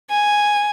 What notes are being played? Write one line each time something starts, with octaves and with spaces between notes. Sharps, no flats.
G#5